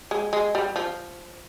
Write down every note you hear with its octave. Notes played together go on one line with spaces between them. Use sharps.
G#3
G#3
G3
F3